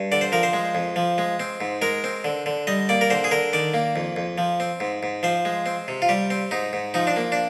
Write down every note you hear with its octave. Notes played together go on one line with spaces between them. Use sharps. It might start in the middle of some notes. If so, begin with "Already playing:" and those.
Already playing: G2
D3 D5
C5
F3 A#4
C5
G#3
F2
F3
G#3
C4
G#2
G#3 A#4
C4
D3
D3
G3 D#5
A#3 D5
A#4
D3 C5
G#4
D3 A#4
D#3 D5
A#3
F2
F2
F3
C4
G#2
G#2
F3 C5
G#3
C4
C3
F4
G3 G4
C4
G#2 D#4
G#2
F3 D#4
D4
A#3
D4